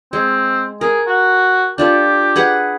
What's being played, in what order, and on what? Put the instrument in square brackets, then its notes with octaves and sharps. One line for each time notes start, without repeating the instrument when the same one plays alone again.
[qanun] G#3 [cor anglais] C4
[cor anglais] G#4 [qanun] A#4
[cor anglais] F#4
[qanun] D4 F4 A4 [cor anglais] G4
[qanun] G#4 B4 F#5